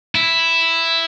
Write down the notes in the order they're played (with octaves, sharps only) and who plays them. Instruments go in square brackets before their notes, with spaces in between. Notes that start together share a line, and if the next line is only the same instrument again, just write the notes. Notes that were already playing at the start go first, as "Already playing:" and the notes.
[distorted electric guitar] E4